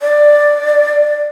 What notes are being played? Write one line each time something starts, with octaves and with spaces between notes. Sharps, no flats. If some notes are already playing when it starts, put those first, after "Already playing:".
D5